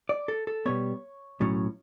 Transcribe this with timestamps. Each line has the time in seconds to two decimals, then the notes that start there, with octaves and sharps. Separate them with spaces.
0.09 D5
0.28 A4
0.47 A4
0.66 B2 G3 B3 C#5
1.40 B1 A2 F#3 C#4